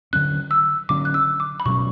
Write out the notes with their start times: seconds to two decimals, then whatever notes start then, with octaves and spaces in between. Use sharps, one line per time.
0.13 D3 F#3 C#4 F#6
0.51 E6
0.89 D3 F#3 C#4 D6
1.05 F#6
1.14 E6
1.40 D6
1.60 B5
1.65 B2 F#3 C#4 C#6